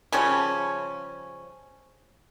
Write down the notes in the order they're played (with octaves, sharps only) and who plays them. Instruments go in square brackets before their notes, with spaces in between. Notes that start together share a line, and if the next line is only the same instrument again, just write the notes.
[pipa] C#3 F3 G3 C#4